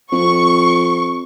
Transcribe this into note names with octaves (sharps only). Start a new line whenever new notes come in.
F2 C#6